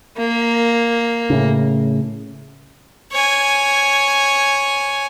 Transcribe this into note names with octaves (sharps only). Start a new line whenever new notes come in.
A#3
A2 C#3
C#5 G#5